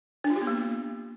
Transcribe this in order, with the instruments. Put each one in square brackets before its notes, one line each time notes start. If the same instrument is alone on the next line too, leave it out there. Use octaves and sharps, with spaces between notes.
[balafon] D4
F4
G4
B3
A#3